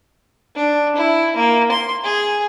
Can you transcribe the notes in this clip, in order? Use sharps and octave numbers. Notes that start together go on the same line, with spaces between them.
D4
E4
A#3
C6
G#4